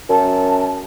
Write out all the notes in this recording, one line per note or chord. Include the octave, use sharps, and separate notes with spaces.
F#2 A5